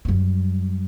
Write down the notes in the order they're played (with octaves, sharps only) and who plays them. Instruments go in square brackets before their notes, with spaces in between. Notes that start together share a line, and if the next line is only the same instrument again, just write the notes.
[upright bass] F#2 G3